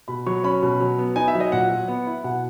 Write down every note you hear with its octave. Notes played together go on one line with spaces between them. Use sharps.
B2 B5
F#3 C#6
C#4 B5
B2
F#3
B3
D#4 G#5
E5
F#3
D#5
A#2 F#5
F#3
B3
E4
B2 F#5